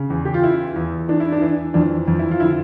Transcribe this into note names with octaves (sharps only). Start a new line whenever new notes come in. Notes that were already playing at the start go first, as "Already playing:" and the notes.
Already playing: C#3
E2
G4
F4
E3 E4
E2
E3 D4
E4
D4
E3
F2 D4
F2
E4
F4
D3 E4